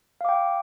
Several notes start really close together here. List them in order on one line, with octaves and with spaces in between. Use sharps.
F5 D6 G5